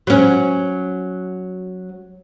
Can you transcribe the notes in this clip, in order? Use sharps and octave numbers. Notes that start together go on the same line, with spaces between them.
F#3 C#4